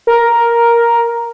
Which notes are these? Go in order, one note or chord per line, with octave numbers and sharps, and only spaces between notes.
A#4